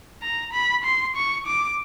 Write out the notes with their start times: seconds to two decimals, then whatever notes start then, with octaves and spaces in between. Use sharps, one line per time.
0.22 A#5
0.53 B5
0.84 C6
1.16 C#6
1.47 D6